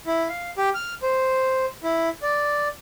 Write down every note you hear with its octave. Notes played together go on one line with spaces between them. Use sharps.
E4
F5
G4
F6
C5
E4
D5